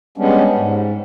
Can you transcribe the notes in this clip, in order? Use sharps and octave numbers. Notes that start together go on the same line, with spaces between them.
G3 G#3 B3 C#4 D4
G#2